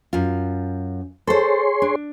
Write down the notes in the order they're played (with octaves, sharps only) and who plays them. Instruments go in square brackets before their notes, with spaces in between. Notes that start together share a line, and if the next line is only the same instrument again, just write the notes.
[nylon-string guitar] F#2 F4
[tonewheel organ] G#4 C#5 C6 [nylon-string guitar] A4 C5
[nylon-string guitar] D4